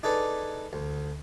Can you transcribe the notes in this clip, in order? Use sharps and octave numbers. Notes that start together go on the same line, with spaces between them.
D4 D#4 G#4 A4 B4 D5
D2